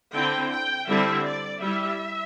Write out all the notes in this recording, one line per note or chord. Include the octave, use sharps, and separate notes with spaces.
D3 C4 E4 G5
G5
D3 G3 C4 E4 E5
D5
G3 E4 E5